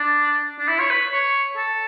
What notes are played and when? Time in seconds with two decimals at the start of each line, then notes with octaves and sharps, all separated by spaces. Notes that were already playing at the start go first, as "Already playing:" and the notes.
Already playing: D4
0.59 D4
0.68 E4
0.79 C#5
0.90 B4
1.12 C#5
1.57 A4